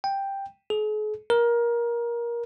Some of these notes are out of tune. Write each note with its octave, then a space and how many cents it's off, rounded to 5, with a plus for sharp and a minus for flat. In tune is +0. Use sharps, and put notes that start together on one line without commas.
G5 +5
G#4 +45
A#4 +20